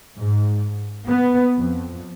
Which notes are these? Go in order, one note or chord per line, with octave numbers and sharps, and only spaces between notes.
G#2
B3
F2